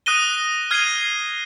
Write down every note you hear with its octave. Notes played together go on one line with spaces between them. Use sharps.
D#6 F#6 A#6 D#7 G7
F6 G#6 C7 D#7 G7